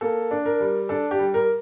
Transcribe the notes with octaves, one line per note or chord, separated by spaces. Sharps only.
A#3 A4
D4
A#4
G3
D4 A4
G4
G3
A#4